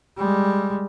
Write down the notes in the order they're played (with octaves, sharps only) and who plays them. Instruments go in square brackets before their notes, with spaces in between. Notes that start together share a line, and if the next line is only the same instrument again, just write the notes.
[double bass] G3 G#3